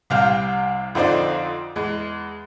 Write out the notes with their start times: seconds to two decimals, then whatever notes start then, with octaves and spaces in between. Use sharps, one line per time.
0.10 C2 C3 F5 G5
0.95 F2 D3 C4 D4 D#4
1.76 E2 G#3